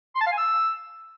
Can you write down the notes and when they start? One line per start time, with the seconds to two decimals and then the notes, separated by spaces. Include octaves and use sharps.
0.15 C6
0.21 A5
0.26 F5
0.32 G#5
0.38 E6